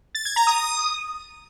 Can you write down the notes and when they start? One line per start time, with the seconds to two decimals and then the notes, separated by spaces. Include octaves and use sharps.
0.15 A6
0.25 G#6
0.36 A#5
0.47 D#6
0.58 D#6